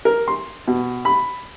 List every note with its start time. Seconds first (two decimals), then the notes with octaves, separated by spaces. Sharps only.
0.05 A#4
0.28 C6
0.68 B2
1.05 B5